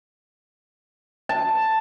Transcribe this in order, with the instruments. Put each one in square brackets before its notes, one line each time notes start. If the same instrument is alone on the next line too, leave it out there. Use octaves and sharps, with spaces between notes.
[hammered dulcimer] A5